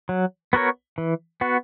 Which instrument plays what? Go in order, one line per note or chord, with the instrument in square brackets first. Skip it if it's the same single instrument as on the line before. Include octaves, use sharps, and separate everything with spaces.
[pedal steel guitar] F#3
B3 F#4 A#4 C#5
E3
B3 F#4